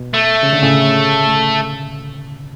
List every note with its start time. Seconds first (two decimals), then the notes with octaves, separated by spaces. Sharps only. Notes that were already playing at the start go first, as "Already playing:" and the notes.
Already playing: B2
0.14 A3
0.43 C#3
0.53 D3
0.62 A2 C#3